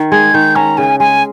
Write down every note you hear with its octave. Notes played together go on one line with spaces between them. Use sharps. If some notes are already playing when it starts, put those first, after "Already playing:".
Already playing: D#3
G#3 G#6
D#3 G6
C#4 A#5
C#3 G#5
G#3 G#5